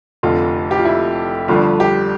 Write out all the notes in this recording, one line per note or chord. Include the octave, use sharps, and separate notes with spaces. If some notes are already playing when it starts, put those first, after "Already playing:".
F1 F2 D3 F4
G4
F4
E4
G1 G2 D3 F3 F4
G4